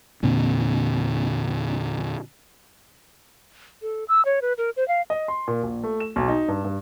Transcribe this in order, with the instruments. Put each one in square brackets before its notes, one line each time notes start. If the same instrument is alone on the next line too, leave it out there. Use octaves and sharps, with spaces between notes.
[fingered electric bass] E2 A#2 D3 C4
[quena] A4
E6
C#5
B4
A#4
C5
F5
[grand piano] D#5
C6
A#2
A#1
A3
E7
B1
D#4
G2
G2